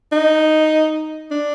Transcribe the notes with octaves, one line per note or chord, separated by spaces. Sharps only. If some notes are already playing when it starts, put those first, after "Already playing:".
D#4
D4